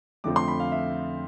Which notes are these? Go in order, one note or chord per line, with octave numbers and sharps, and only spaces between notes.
F2 D3 F3 A3 C4 D6
C6
B5
F5
E5